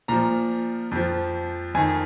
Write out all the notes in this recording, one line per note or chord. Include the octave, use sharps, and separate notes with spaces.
A#2 F3 A#5
F2 F3
F2 D#3 G#5